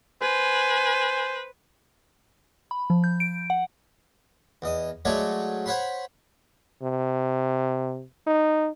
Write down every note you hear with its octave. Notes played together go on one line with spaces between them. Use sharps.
B4 C5 G#5
B5
F3
G6
D7
F#5
E2 D#5
F#3 G#3 A3 F#4 C#5 D5
C5 C#5 F#5 B5 C6
C3
D#4